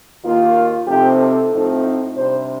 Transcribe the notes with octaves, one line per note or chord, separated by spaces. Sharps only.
D#2 D#3 A#3 F4
C3 F3 A3 C4 D#4 G4
A4
A2 F3 C4 D#4
C3 G3 D4 C5